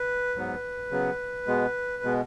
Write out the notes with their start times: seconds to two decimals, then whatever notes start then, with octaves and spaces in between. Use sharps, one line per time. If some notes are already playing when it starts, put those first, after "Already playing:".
Already playing: B4
0.36 G#2 F#3 B3
0.91 C#3 F#3 B3
1.47 B2 G#3 B3
2.03 B2 G#3 B3